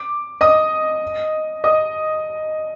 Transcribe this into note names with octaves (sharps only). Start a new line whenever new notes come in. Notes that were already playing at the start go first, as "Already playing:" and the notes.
Already playing: D6
D#5 D#6
D#5 D#6